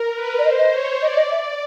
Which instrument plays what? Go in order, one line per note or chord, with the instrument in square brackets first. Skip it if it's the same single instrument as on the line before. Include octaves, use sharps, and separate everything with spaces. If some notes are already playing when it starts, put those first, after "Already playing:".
Already playing: [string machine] A#4
B4
[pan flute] D5
[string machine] C5 [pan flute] D#5
[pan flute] D#5
[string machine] C#5
[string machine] D5 [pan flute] D#5
[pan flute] D#5
[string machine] D5 [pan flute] E5